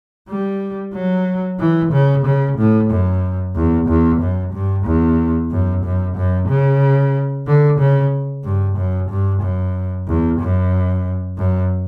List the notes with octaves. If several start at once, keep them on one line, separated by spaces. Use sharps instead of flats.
G3
F#3
E3
C#3
C#3
A2
F#2
E2
E2
F#2
G2
E2
F#2
F#2
F#2
C#3
D3
C#3
G2
F#2
G2
F#2
E2
F#2
F#2